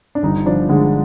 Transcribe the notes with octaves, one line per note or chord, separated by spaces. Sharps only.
D4
G1 D#4
F3 D4
D3 G#3